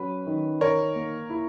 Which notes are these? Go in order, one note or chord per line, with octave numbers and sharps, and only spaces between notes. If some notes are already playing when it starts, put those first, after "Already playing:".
Already playing: F#3 C#4 B4
D#3
D#3 A#4 C#5
A#3
E4